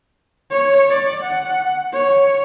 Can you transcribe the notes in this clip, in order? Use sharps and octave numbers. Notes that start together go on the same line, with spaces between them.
C#5
D5
F#5
C#5